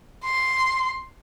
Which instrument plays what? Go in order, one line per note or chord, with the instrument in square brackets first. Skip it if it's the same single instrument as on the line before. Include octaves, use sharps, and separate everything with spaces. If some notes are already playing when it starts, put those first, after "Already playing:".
[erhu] C6